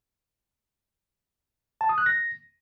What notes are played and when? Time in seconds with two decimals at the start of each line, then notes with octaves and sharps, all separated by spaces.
1.81 A5
1.89 D#6
1.98 F#6
2.06 A#6